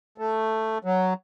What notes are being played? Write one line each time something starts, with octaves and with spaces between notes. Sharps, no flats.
A3
F#3